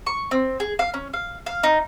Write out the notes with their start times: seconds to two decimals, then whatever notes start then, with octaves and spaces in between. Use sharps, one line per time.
0.06 C#6
0.31 C4
0.60 G#4
0.79 F5
0.94 C#4
1.13 F5
1.46 F5
1.63 D#4